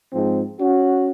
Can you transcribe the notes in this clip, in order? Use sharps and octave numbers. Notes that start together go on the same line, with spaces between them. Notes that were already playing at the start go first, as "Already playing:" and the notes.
G#2 F3 C4
C#4 F#4